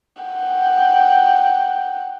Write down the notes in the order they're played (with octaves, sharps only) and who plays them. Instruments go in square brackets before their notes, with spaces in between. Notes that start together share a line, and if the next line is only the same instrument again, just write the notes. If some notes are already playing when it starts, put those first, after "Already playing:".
[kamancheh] F#5 G5